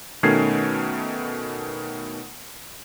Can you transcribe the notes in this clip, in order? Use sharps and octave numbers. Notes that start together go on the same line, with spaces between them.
B2 D#3 A3 C#4 G#6 C7